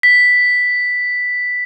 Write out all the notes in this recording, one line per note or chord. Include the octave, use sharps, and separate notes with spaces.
B6